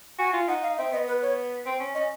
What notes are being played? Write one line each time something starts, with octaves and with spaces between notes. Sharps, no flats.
F#4 G#5
F4
D#4 F#5
F5
C4 E5
B3 D#5
B4
C#5
C4
C#4
C#4 D#5